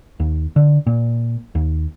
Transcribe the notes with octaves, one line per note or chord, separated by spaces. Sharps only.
D#2
D3
A#2
D#2